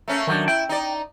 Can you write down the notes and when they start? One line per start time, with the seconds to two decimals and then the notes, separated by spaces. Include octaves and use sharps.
0.08 A3 A#3 C#4
0.27 D#3 F#3 A3 D4
0.48 E4 G5
0.69 D#4 D5